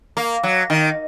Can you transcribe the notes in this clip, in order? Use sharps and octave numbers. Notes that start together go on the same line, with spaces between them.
A#3
F#3
D#3